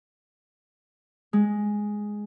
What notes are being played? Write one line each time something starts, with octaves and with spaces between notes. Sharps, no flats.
G#3